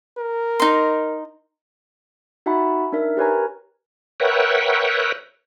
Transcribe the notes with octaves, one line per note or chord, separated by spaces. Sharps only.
A#4
D#4 C6
D#4 F#4 E5 F#5 A5 B5
D4 D#4 A#4 E5
G4 A#4 B4 C#5 G#5 A#5
A#4 B4 C#5 E5 F#5 G5